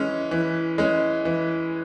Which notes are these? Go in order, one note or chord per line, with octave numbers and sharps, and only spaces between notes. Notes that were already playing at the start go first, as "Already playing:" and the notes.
Already playing: E3 G#3 C#4
E3
G#3 C#4
E3